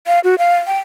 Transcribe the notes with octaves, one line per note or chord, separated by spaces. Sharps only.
F5
F#4
F5
G5